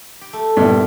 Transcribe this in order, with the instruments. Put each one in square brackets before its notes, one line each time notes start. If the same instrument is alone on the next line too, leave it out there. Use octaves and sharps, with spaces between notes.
[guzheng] G4
A3
[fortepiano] A#1 E2 G2